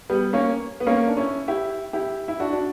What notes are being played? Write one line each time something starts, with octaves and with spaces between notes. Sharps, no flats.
G3 B3
A#3 C#4
B3
A#3 C#4
D4
C#4 E4
E4 G4
E4 G4
E4
D4 F#4
D4